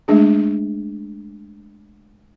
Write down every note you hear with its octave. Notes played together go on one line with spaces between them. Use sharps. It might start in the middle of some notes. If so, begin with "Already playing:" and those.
G#3 A3 D4 G#4